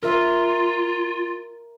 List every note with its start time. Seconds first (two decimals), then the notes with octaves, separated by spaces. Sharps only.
0.03 F4 A#4 E5